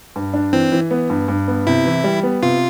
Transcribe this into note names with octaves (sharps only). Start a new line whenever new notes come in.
G2
D4
E3 C4
E3
B3
G2
G2
B3
C3 E4
E3
G3
B3
C3 F4